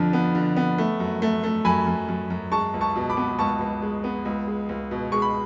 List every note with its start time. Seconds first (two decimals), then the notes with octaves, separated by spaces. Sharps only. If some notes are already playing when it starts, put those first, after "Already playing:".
Already playing: F2 D3 F3
0.13 B3
0.35 D3
0.57 B3
0.78 A3
1.00 F#2
1.22 A3
1.43 A3
1.65 F#2 G#5 B5
1.87 F#2
2.09 F#2
2.30 F#2
2.52 G#3 A5 C#6
2.74 C#2
2.81 A5 C#6
2.96 B2
3.09 B5 D6
3.17 B3
3.38 C#2 A5 C#6
3.60 C#2
3.82 G#3
4.04 B3
4.25 C#2
4.47 G#3
4.69 C#2
4.91 B2
5.12 G#3 C#6
5.22 B5